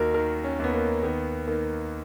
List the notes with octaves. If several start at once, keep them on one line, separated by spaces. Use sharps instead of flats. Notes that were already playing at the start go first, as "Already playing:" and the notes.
Already playing: D#2 D#3 F#4 A#4
D#3 A#4
C#4
D#2 B3
A#3
D#3 B3
D#3 A#3